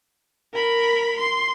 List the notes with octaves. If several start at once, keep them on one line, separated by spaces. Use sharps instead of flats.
A#4 B5
C6